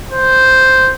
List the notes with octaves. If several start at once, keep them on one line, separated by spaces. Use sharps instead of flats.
C5